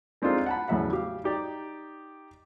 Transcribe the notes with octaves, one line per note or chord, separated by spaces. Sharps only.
G#3 C4 D4 D#4 F4 A4
F#5 A5 B5
E2 A2 C#3 F#3 E5 F#5
G4 F5
D#4 G4 D5